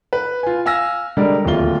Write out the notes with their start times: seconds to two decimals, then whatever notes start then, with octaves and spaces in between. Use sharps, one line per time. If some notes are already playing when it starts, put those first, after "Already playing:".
0.13 B4
0.43 F4 G#5
0.66 F5 G#5 E6 F6 A#6
1.17 D3 G3 G#3 A#4 D5
1.44 D1 D#2 A3 F4 G7